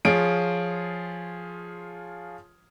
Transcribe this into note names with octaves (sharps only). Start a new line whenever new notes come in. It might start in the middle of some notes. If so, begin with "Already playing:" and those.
F3 F4 G#4 C#5 D7